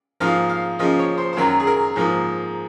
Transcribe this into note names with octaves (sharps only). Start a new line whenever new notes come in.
G#2 F3 A#3 F5
F5
C#3 F3 A#3 D#5
C#5
C5
C5
F#2 D#3 F#3 A#4
G#4
A#4
G#2 F3 A#3